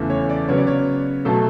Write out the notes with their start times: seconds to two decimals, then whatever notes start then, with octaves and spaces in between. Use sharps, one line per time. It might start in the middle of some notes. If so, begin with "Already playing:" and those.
Already playing: E2 C#3 E3 A3
0.10 C#5
0.30 D5
0.48 C#3 F#3 B3 C#5
0.58 D5
0.67 C#5
1.25 B2 F#3 A3 A4